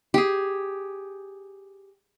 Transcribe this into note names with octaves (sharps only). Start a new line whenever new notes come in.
G4 G#4